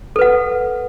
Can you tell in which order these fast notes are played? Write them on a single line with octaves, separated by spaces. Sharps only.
A4 B4 F#5